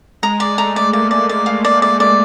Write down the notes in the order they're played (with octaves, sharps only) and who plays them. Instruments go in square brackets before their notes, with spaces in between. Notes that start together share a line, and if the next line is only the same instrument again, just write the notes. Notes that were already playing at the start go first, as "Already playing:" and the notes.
[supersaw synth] G#3 [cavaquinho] A#5
[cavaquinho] D5
[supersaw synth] A3 [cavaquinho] A#5
[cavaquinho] D5
[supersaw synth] A#3 [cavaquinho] D5
[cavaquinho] D5
D5
F5
D5
D5
D5